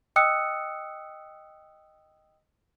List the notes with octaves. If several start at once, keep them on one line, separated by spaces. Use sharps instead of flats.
D#5 G5 D#6 E6 F#6 C#7